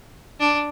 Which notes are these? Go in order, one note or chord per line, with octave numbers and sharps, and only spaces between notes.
D4